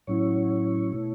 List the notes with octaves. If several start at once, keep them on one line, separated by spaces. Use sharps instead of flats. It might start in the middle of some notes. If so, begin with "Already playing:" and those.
A2 F#3 C#4 E4 C#5
B2 A3 E4